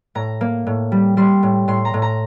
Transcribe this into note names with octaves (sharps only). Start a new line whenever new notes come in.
A2 A#5
A#3
A2
G3
G3 C6
A2
A2 C6
A#5
A2
A#5